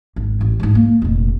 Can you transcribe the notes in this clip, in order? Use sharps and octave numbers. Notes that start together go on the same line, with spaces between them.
G#1
A1
G#2 D#4
A#3
F1 A#2